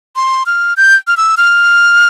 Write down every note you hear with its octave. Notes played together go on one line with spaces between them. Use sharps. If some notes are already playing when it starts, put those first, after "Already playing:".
C6
F6
G6
F6
E6
F6